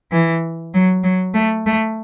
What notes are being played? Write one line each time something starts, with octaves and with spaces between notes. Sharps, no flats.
E3
F#3
F#3
A3
A3